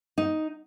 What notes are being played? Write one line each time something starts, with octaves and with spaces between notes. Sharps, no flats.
D#4